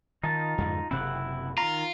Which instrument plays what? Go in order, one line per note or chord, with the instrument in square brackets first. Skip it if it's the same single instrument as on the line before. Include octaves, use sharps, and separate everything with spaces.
[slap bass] D#3 [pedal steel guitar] D#4 F4 A5
[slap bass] F2 G#2 D3
[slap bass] F#1 C3 C4 [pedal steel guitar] E4 F#5
[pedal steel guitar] D#3 A#5 [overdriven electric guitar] F4